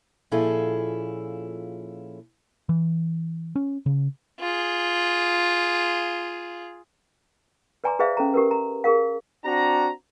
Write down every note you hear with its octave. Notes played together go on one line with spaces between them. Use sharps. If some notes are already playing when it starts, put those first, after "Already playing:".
A#2 F3 C#4 E4 G#4 A4
E3
C#4
C#3
F4 G#4
B4 D5 G#5 A#5 C6 D6
G#4 B4 C5 D5 E5 F5
C#4 A4 A#5
G4 A#4 B4
A#5
G#4 A#4 F5
C4 D4 F#4 F#5 A#5